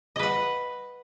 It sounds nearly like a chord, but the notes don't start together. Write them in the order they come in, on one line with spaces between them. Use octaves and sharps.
D#5 B4 F#5